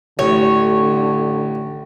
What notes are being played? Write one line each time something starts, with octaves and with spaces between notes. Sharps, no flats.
A1 D3 C#5